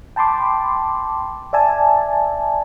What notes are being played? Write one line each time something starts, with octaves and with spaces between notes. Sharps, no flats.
G5 A5 B5 C6 D6
D5 E5 G#5 A5